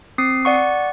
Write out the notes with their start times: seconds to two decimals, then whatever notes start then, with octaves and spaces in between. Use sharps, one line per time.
0.18 C4 D#6 C7
0.45 D5 F#5 C#6